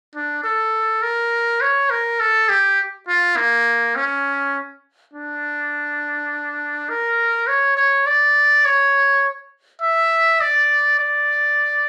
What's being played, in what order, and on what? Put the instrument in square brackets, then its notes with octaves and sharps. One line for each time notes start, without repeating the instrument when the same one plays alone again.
[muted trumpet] D4
A4
A#4
C#5
A#4
A4
G4
F4
A#3
C#4
D4
A#4
C#5
C#5
D5
C#5
E5
D5
D5